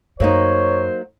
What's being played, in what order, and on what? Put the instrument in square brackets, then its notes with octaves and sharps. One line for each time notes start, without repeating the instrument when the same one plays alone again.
[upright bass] F#2 [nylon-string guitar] F#3 A#3 D#4 [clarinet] C5 [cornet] C#5